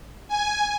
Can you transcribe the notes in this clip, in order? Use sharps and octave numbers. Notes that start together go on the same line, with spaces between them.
G#5